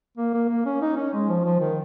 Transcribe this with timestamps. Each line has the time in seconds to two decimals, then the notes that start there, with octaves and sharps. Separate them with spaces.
0.17 A#3
0.34 A#3
0.49 A#3
0.66 C#4
0.81 D#4
0.96 C#4
1.13 G#3
1.29 F3
1.45 F3
1.60 D#3